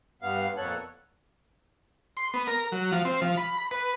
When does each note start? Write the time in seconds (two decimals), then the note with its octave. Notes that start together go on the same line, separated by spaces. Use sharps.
0.22 G2 B3 F5
0.57 F2 A#2 B3 A4 C#5 F#6
2.17 C6
2.34 B3
2.47 A#4
2.72 F#3
2.92 F3
3.05 C4
3.22 F3
3.37 B5
3.58 B5
3.71 B4